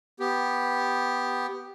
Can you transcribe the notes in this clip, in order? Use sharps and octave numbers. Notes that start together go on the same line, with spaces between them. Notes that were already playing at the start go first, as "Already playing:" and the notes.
B3 G4